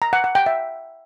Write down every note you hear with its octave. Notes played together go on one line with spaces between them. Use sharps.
A#5
F#5
F#5
G5
E5